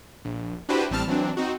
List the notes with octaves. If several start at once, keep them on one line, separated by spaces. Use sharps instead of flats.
A#1
D4 E4 F#4 G4 B4 C5
A1 G3 C4 A5 F6
E3 F#3 C4 D4
C4 D#4 F#4